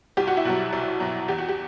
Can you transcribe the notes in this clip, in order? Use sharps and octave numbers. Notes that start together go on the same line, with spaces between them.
C2 G4
F#4
E4
B2 F#3 F#4
C2
B2 F#3
E2 G4
F#4
G4